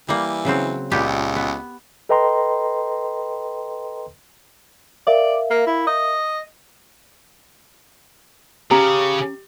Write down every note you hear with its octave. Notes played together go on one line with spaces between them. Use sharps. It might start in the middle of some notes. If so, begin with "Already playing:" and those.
E3 G3 A#3
C#3 F#3 C4
C#2 A#2 B3 G4
B3
A4 B4 D#5 G5 A#5 C6
A#4 D5 E5 F5
A#3
E4
D#5
C#3 C#4 G4 A#5